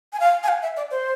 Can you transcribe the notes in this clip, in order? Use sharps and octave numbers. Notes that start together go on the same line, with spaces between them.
G#5
F5
G#5
F5
E5
D5
C5